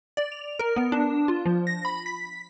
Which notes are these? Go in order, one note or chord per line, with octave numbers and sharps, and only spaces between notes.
D5
F7
A#4
B3
D4
F4
F3
A#6
B5
B6